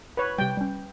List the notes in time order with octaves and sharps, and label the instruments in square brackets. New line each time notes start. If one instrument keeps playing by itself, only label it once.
[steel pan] B4 C#5
[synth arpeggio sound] C3 G3 [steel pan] G5
[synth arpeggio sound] G3 C#4